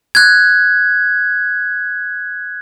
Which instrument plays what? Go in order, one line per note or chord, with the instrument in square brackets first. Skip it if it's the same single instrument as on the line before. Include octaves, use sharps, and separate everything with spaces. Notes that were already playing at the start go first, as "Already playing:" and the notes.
[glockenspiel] F#6 G#6